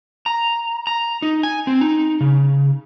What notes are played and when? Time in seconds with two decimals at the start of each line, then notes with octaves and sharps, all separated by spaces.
0.26 A#5
0.87 A#5
1.22 D#4
1.43 G#5
1.67 C4
1.81 D#4
2.21 C#3